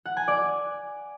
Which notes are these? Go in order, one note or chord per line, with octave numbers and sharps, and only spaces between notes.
F#5
G#5
D5